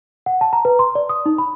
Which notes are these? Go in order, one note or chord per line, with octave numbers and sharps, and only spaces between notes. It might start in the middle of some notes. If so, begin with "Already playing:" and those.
F#5
A5
A#5
B4
C6
D5
D#6
D#4
B5